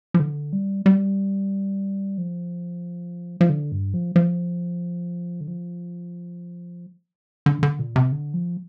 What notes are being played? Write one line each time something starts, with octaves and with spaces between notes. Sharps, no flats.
F3
D3
G3
G3
F3
F3
D3
G2
F3
F3
D3
F3
D3
D3
A#2
C3
D3
F3